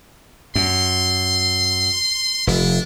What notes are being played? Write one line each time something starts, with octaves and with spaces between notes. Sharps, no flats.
F#2 C6
F1 D4